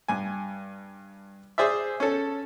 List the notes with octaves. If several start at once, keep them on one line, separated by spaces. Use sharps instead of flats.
G2 G#5
G#4 C5 D5 E5
C#4 A4